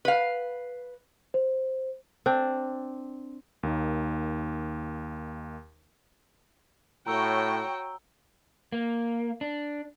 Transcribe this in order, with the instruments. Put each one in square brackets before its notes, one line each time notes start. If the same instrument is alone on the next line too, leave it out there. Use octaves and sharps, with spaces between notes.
[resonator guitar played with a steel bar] B4 F5
[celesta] C5
[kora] C4 D4
[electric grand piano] D#2 A#3 D#4
[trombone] A2 [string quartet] F#4 C#5 [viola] G5 [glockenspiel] A#5 E6 G7
[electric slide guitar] A#3
D4